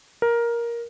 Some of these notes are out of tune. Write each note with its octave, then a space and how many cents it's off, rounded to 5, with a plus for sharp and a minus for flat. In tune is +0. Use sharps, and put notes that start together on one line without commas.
A#4 +10